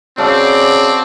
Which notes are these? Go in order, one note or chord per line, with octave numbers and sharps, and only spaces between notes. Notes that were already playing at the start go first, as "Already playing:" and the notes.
C#3 C4 F#4 A4 D5 F5